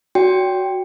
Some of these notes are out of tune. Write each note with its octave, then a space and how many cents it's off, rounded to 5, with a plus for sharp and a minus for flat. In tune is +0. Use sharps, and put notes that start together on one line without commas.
F#4 +0 C#5 +45 G5 +0